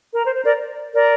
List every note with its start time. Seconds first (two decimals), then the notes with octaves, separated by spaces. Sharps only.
0.14 A#4
0.24 C5
0.35 C5
0.44 A#4 D5
0.95 A#4 D5